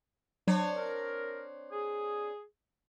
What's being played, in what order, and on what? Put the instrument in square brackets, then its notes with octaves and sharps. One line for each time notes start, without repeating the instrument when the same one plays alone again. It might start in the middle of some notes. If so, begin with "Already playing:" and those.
[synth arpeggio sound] F#3 [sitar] C4 D4 C#5
[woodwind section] A#4
G#4